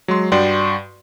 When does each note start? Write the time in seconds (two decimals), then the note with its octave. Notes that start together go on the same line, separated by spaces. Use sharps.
0.08 F#3 G#3 C6
0.32 G2 F#4 D5 G5 C6